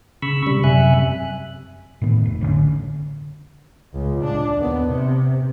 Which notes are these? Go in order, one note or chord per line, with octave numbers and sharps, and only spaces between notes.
C#3 B5 C#6 E6
C3 G3
F#2 C3 E5 G#5 F#6
A2 D#3 B3
F1
A1 D3 F#3 C#4
C#2
D4
D#2 B3
C3